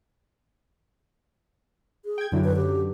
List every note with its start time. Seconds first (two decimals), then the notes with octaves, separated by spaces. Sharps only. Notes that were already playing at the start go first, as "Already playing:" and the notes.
2.05 G#4
2.18 G5 G#6
2.32 F#2 D3 F#3 E4
2.44 B4
2.56 G4